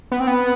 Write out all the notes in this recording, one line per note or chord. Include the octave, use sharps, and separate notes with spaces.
B3
C4
B3